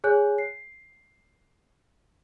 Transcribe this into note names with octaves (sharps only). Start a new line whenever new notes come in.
G#4 C#5 G#5 F#6 G6
C7